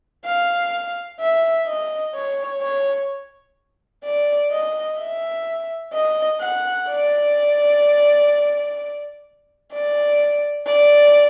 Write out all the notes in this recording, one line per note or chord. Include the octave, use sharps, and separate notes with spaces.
F5
E5
D#5
C#5
C#5
D5
D#5
E5
D#5
F#5
D5
D5
D5